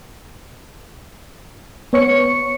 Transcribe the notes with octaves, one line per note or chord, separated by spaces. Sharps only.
B3 C#5 C#6 C#7